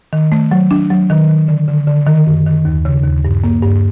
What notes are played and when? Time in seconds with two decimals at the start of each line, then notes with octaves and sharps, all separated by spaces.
0.13 D#3
0.32 A3
0.51 F#3
0.71 D4
0.90 F#3
1.10 D#3
1.29 D#3
1.48 D3
1.68 D3
1.87 D3
2.07 D#3
2.27 F#2
2.46 D#3
2.65 D#2
2.85 C#3
3.04 D#2
3.25 G2
3.44 A#3
3.63 G2